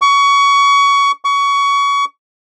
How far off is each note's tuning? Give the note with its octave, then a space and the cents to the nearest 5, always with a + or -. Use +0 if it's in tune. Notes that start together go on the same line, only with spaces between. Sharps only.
C#6 +25
C#6 +25